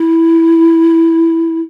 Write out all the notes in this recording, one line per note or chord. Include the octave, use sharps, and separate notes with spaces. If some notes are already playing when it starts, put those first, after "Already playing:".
Already playing: E4